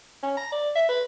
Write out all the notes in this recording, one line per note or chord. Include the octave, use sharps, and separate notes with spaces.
C#4
A#5
D5
E5
B4